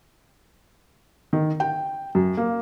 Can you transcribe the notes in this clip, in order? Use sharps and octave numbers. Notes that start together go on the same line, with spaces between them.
D#3
G5
F#2
A#3